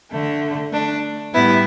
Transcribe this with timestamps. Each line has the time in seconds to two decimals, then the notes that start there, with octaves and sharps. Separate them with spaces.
0.12 D3 A3
0.72 A3 D4
1.34 A2 G3 B3 E4